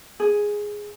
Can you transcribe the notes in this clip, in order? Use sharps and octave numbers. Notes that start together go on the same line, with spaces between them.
G#4